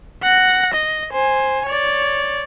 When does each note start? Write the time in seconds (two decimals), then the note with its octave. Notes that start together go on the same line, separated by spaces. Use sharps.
0.23 F#5 A#6
0.74 D#5
1.13 C5 G#5
1.67 C#5 D5